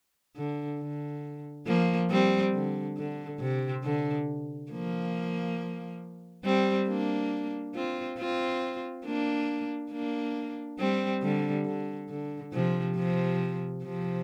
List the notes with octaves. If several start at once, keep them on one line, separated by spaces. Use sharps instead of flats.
D3
D3
F3 A#3
G3 C4
D3
D3
C3
D3
F3 A#3
G3 C4
A#3 D4
C4 F4
C4 F4
A#3 D4
A#3 D4
G3 C4
D3 G3
D3
D3
C3 F3
C3 F3
C3 F3